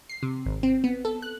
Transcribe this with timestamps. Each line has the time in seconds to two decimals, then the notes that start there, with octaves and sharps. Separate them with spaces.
0.09 C7
0.23 C3
0.46 G#1
0.63 C4
0.84 B3
1.05 A4
1.22 F#6